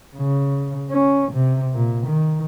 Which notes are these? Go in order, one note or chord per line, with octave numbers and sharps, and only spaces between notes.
C#3
C#4
C3
A#2
D#3